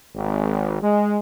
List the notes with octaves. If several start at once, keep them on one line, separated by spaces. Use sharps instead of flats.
G#1
G#3